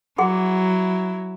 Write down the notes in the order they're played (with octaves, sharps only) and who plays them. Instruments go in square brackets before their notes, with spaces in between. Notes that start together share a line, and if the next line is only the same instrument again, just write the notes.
[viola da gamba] F#3 E4 [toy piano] G#4 F#5 C6